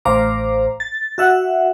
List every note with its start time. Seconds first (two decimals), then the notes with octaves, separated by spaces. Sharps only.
0.05 A1 C5 F5 A#5 D6
0.80 A6
1.18 F#4 E5 F#5